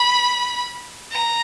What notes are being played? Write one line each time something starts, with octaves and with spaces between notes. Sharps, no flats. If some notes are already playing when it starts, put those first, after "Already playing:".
Already playing: B5
A#5